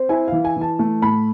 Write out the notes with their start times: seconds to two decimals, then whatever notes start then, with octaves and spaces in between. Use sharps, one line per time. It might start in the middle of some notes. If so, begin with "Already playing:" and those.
Already playing: C4
0.09 E4 G#5
0.28 E3 F5
0.45 G#5
0.57 E3 A5
0.79 A3
1.02 A2 B5